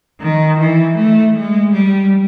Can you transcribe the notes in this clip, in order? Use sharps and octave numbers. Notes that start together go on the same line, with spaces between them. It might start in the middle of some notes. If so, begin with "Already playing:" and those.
D#3
E3
A3
G#3
G3